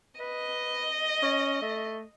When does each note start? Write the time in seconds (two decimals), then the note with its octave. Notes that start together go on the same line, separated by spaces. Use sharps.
0.20 B4 D#5
1.22 C#4
1.62 A3